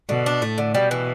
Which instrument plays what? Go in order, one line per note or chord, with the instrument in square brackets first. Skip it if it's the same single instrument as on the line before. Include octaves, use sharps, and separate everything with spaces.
[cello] B2 [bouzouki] D3
[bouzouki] D4
[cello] A2 [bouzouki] A3
[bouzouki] D3
[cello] B2 [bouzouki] G3
[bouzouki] E3